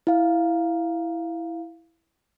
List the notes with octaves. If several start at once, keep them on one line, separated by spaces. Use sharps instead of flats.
E4 F5